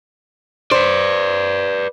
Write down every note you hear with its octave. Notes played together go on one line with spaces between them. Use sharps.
B4 C5 D5